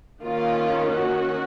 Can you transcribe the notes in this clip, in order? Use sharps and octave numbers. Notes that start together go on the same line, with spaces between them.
D#3 A#3 C#4 F4
F#4